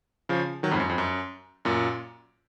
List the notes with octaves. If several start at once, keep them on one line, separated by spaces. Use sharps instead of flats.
C#3 F3
D#3 F#3
F2 G#2
F#2
F2
F#2
F#2 A#2